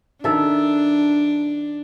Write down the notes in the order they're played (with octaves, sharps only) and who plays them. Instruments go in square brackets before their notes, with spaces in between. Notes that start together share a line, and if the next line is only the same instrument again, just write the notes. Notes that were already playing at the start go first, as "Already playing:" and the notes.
[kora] D#3 A4 E5 [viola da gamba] D4